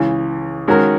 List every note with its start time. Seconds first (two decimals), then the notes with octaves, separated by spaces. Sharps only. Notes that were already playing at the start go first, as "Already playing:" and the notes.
Already playing: C#2 C#3 E3
0.68 D#3 G#3 C#4 F#4 A#4